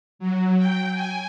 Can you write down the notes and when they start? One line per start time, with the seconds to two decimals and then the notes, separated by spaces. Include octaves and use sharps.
0.19 F#3
0.57 G5
0.93 G#5